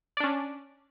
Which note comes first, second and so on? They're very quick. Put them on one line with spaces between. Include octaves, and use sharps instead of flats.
D5 D4 C#4